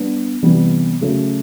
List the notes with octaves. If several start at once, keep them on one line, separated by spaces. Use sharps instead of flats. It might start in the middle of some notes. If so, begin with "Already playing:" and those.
Already playing: G3 B3 D4
C3 E3 G3 B3
C#3 F#3 A3 C#4